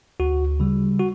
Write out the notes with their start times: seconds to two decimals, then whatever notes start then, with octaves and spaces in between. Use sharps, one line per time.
0.20 D2 F#4
0.60 C#3 G3
0.99 F#4